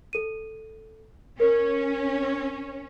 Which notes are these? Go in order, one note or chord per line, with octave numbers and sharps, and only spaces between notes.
A4 D#7
C#4 A#4